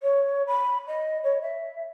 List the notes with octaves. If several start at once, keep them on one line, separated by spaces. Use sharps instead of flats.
C#5
B5
D#5
C#5
E5